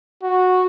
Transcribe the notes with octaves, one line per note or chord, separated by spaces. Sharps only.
F#4